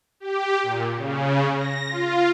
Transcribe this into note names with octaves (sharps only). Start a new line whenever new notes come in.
G4
A#2
C#3
A#6
F4